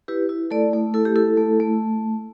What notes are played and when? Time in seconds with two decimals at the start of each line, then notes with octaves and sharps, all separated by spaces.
0.08 E4 G4 B4
0.29 E4
0.51 A3 A4 D5
0.73 A3
0.94 E4 A4
1.05 G4
1.15 E4 A4
1.37 A3
1.60 A3